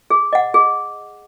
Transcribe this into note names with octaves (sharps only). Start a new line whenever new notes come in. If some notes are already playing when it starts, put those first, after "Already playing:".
G#4
D#5 F#5
G#4